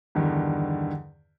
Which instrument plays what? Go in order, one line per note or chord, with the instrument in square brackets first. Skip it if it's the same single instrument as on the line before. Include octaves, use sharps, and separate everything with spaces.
[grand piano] E2 G2 D3 D#3